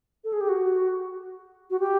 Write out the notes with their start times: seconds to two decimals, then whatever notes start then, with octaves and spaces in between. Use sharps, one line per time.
0.24 A4
0.33 G#4
0.41 G4
0.49 F#4
1.70 F#4
1.80 G4